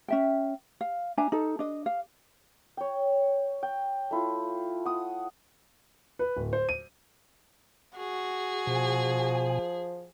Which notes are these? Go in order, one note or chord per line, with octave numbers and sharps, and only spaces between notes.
C#4 E5 G5
F5
D4 E5 G#5 A#5
D#4 A4
D4 D#5
F5
C#5 G5
G5
A3 E4 F4
F#5 D#6
B4
D1
C5
D#7
F#4 G#4
B2 F3 G#5